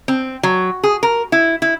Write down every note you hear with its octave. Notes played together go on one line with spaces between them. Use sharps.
C4
F#3
G#4
A#4
E4
E4